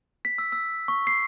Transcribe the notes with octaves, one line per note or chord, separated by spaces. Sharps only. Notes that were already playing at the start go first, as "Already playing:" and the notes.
B6
E6
E6
C#6
C7